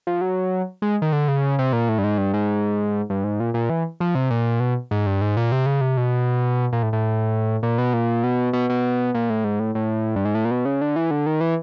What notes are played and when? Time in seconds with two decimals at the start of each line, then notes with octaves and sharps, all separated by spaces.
0.07 F3
0.21 F#3
0.82 G#3
1.02 D#3
1.12 D3
1.28 C#3
1.59 C3
1.73 A#2
1.89 A2
1.98 G2
2.04 G#2
2.18 G2
2.34 G#2
3.10 G2
3.24 G#2
3.40 A#2
3.54 A#2
3.70 E3
4.00 F3
4.15 C3
4.30 A#2
4.60 B2
4.91 G#2
5.06 G2
5.21 G#2
5.37 A#2
5.52 C3
5.66 C#3
5.81 C3
5.97 B2
6.73 A#2
6.83 A2
6.93 A2
7.63 A#2
7.78 B2
7.94 A#2
8.24 B2
8.53 B2
8.70 B2
9.14 A#2
9.30 A2
9.44 G#2
9.60 A2
9.75 A2
10.16 G2
10.25 G#2
10.35 A2
10.45 A#2
10.51 B2
10.65 C#3
10.81 D3
10.96 E3
11.11 D3
11.26 D#3
11.41 E3